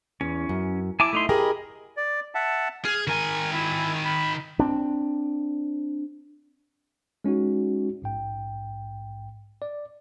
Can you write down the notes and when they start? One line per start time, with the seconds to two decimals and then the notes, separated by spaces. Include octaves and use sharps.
0.21 E2 C#4
0.49 F#2
1.00 E4 G#5 A5 D6
1.13 A3 D#4 C6
1.29 G4 G#4 A#4 D#5 B5
1.97 D5
2.35 E5 F#5 A5
2.85 G#4 F6
3.07 D#3 A#4 G#5
3.53 E4 E5
4.05 B5
4.59 C4 D4
7.24 G#3 C#4 D#4 F#4
8.02 A#1 G#2 G5
9.62 D5